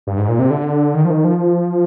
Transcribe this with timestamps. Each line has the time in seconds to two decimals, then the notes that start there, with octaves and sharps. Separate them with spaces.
0.07 G2
0.18 G#2
0.29 A#2
0.39 C3
0.50 D3
0.94 D#3
1.05 F3
1.10 D#3
1.24 F3